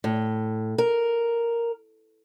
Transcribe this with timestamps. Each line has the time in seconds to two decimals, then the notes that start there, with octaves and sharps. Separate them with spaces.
0.04 A2
0.78 A#4